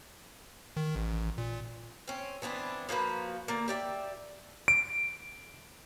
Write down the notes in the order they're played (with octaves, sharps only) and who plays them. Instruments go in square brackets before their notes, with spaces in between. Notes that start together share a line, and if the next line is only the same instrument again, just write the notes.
[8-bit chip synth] D#3
A1
A#2
[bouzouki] C4 C#4
E3 B3 C4 D4
F3 A#3 F#4 B4
D3 A#3
G4 D5 E5
[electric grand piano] D7